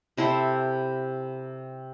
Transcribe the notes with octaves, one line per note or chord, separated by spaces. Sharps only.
C3 E4 A4 C5